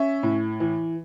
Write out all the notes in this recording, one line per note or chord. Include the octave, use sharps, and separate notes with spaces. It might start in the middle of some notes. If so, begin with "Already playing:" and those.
Already playing: C#4 E5
A2
E3